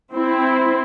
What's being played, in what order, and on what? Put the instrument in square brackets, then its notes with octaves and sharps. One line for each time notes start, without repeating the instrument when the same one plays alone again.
[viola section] C4 E4